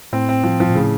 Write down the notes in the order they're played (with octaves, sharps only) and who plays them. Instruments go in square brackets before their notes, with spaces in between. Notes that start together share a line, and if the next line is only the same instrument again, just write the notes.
[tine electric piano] A2 [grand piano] C4
[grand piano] C4
F3
F3
[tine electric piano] A#2
[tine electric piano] A2 [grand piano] C#3